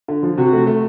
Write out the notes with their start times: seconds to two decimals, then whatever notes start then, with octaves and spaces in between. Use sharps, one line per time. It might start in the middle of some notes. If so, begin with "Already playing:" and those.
0.08 D3
0.23 F3
0.38 C3 F#4
0.53 A3
0.67 A3